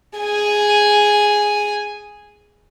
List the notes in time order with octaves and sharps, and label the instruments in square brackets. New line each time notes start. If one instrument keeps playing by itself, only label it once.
[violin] G#4 G#5